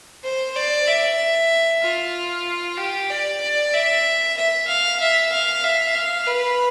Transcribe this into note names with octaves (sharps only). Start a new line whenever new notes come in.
C5
D5
E5
F4
G4
D5
D5
E5
E5
F5
E5
F5
E5
F5
B4